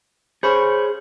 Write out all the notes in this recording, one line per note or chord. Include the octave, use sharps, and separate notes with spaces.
G#4 C5 C#5 B5 C#6